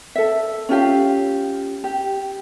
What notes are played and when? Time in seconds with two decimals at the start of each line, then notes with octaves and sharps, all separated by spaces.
0.15 A4 E5
0.69 C#4 F4 G4 F5
1.84 G4